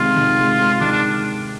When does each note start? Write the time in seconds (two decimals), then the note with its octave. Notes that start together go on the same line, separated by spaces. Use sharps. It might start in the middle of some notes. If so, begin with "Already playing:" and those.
Already playing: C3 D#3 G#3 F4
0.16 D#3
0.38 G#3
0.59 G#3
0.81 D#3 D4
0.92 D4